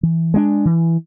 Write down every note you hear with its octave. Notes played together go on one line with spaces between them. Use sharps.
E3
G#3 B3 D4
E3